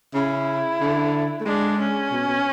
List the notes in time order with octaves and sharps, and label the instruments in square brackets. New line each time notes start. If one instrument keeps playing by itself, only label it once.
[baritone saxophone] C#3 [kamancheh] E4
[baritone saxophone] D3
A3
[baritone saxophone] G#3 [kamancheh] D4
[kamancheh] C#4
[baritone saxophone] B2
B2